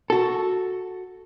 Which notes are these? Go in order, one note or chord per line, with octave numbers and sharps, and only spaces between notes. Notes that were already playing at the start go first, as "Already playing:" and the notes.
F#4 A4